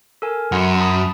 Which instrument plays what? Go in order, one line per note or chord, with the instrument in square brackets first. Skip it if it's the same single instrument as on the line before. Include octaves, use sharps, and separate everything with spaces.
[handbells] A4 A#4 G#5
[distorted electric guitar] F#2 [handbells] F#5 B5 C6
[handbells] A5 B5 D#6